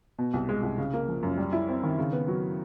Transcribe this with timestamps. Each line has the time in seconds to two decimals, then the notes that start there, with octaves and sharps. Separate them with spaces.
0.18 B2
0.34 C2
0.49 G#3
0.63 C2
0.78 C#3
0.94 A#3
1.08 F3
1.23 F#2
1.37 G3
1.53 E4
1.69 C4
1.83 D#3
1.98 C#3
2.13 B3
2.28 F#3